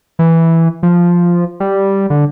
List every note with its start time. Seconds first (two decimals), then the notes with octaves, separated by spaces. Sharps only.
0.19 E3
0.83 F3
1.60 G3
2.10 D3